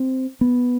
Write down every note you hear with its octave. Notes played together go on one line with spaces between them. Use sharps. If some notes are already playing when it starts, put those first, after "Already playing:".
Already playing: C4
B3